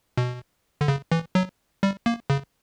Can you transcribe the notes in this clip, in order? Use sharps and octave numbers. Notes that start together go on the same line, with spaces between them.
B2
D3
C#3
E3
F#3
G3
A#3
C#3